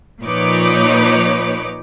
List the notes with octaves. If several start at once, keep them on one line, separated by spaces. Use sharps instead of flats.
A#2 F3 D#4 B4 C#5 D6